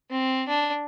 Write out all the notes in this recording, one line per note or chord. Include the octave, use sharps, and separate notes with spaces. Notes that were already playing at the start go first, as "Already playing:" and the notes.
C4
D4